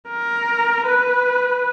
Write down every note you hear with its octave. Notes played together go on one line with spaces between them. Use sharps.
A#4
B4